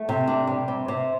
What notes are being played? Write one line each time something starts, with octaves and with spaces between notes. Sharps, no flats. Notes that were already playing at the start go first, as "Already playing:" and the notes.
Already playing: A3
C3
D4
G3
C3
C3